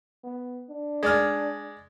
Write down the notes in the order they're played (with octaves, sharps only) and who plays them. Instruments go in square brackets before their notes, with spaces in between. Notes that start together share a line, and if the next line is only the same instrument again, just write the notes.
[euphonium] B3
D4
[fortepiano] G#3 D5 F6